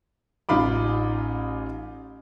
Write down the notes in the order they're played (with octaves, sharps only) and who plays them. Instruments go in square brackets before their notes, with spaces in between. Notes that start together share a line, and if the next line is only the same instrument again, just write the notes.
[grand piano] A1 D#4 F4 B5 D6